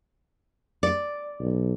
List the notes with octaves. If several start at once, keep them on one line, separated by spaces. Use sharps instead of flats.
D5
B1